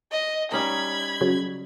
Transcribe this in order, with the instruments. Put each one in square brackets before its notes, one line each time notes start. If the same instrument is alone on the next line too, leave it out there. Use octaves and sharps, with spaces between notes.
[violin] D#5
[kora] G3 C#4 D#4 [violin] B5 G#6
[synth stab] C#3 F#3